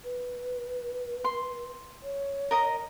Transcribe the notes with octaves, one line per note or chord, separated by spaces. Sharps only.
B4
C6
C#5
A#4 D#5 A#5